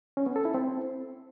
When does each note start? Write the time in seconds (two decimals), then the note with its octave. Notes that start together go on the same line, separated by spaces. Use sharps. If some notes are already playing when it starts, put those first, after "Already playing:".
0.17 C#4
0.26 B3
0.36 A4
0.45 E4
0.54 C4